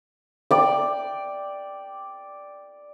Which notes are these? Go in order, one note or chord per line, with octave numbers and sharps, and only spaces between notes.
D5 G5